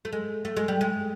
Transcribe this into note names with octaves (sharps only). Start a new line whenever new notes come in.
A3
G#3
A3
G#3
G3
G#3